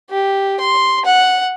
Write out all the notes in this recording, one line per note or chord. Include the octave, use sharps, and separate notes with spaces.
G4
C6
F#5